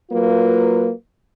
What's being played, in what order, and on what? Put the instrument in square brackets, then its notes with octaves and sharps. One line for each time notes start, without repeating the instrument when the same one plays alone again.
[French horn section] F#3 A#3 F4 B4